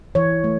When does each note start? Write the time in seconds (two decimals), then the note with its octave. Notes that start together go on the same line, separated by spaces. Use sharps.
0.15 E3 C#5
0.44 A3